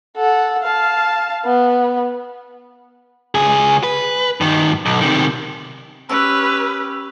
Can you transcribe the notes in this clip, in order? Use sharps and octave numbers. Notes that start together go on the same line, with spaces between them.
A4 F#5
F5 A5
B3
C#2 G#4
B4
G2 D#3
B1
C3 D#3
C#4 G4 B4 E6